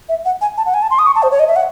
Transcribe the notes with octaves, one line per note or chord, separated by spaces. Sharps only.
E5
F#5
G#5
A5
F#5
G#5
A5
C6
D#6
C#6
A5
C5
C#5
D#5
E5
F#5